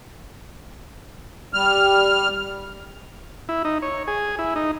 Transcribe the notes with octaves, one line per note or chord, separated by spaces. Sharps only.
G3 F6
E4
D#4
C#5
G#4
E4
D#4